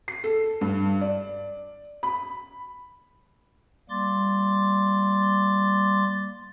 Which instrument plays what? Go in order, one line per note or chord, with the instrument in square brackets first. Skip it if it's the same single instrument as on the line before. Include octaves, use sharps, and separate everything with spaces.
[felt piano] C7
A4
G2
D5
B5
[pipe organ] G3 A#3 C6 D6 A6